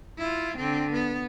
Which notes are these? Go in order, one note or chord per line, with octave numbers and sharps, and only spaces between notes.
E4 F4
D3 C4
B3